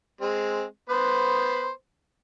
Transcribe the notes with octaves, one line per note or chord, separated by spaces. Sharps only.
G#3 C4
B3 B4 C5